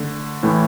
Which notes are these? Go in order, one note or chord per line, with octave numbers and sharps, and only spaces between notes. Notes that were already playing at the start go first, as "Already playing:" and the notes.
Already playing: D3 A3
A2 E3 A3